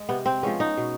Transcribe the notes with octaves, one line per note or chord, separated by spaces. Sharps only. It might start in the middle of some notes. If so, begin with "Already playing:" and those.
Already playing: G#3
C3 B3
C4
F3 G#3 B3 C#4
D#4
B2